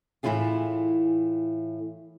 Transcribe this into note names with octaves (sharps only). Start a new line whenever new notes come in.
A2 E3 F#3 E4 F4 G#4